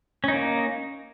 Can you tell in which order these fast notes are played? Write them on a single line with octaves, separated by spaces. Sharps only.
C#4 D#4 A#3